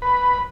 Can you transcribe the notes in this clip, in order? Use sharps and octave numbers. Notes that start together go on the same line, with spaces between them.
B4